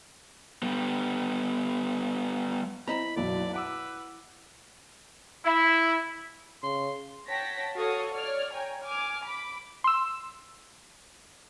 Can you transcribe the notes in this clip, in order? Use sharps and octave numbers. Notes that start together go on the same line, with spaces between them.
G3 B3
C4 E4 D#5 A#5 B5
F#1 B1 F#3 D5
B4 F#5 D6 E6
E4
C#3 C6
C#5 F#5 G5 A5 A#6 B6
F#4 A4 C#5 F5 C#6 D#6
C#5 D5 F6
C#5 G5 G#5 A#5
G#5 D6 F6
B5 D6
C6 E6